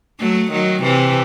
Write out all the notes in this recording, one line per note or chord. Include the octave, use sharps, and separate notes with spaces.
F#3 A3
D#3 F#3
C3 E3